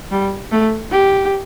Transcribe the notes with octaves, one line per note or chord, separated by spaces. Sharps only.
G3
A3
G4